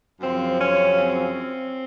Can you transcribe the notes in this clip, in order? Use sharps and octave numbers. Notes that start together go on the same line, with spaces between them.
F#2 C#3 F3 C4
C#4
C4